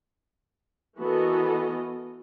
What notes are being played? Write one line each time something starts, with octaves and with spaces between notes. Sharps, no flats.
E3 B3 F#4 A4 A#4 D#5